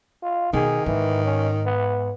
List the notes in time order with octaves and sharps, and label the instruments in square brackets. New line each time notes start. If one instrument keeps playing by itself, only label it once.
[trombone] F4
[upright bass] B2 [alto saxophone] D#3 [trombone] G#4
[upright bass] G#2 [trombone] E3
[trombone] C#4
B3